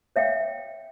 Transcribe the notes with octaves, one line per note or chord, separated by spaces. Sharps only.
C#5 E5 F5 G5